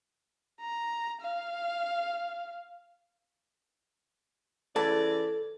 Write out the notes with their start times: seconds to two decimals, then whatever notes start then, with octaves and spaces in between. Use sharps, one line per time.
0.61 A#5
1.21 F5
4.76 C#3 E3 A4 D5 A5